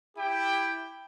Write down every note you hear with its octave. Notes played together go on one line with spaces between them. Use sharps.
E4 G4 G5